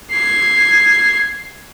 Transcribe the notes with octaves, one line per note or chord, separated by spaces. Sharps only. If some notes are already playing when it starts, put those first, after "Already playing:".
G#6 C7